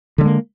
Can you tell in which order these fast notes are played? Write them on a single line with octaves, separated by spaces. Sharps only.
D3 G3 G#3 A#3